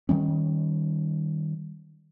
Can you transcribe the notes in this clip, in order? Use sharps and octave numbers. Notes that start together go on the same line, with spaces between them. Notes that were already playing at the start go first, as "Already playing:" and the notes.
D#3 F3 G3 C#4